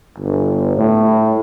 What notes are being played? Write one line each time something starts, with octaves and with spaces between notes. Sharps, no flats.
G1
A2